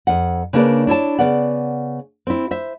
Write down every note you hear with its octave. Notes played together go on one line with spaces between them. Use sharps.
F2 F#5
C#3 A#3 D4 A#4 B4 D5
D4 E4 C#5 A5
C#3 B3 D5 F#5
C4 E4
C5 E5